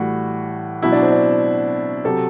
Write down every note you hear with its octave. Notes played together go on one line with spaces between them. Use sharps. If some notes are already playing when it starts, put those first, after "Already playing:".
Already playing: A2 E3 G3 F#4
B2 F#3 E4
D4
C4
D4
C3 F#3 A4